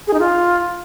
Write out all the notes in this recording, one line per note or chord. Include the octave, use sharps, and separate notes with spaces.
G#4
D#4
F4